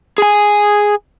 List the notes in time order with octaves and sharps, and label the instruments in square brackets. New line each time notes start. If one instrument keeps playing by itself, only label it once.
[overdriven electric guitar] G#4 G#5